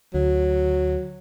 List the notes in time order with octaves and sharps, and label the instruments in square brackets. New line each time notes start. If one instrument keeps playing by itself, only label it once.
[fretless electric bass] D2 [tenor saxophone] F#3